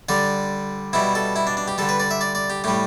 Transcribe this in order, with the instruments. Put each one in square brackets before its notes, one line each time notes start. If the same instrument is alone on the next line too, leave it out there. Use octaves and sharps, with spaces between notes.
[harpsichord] D3 G3 D5
B2 G3 E4
A4
E4
D4
D4
G4
D3 G3 A4
B4
D5
E5
D5
D5
G4
A2 G3 G4